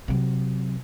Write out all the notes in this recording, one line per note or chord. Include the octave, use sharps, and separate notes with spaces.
C3 F#3